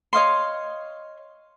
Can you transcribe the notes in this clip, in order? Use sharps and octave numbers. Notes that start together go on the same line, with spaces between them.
C#5 D#5 F5 C6